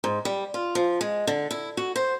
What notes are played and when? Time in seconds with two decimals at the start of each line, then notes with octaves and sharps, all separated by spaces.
0.04 G#2
0.25 G3
0.54 F4
0.75 F3
1.01 G#3
1.27 D3
1.51 E4
1.77 F#4
1.96 C5